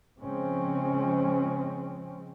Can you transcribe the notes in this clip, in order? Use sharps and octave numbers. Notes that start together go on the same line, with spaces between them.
C#3 F3 G#3 C4 C#4